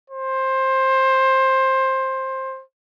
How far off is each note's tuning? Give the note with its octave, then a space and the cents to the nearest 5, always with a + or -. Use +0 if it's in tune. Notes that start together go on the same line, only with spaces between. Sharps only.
C5 +15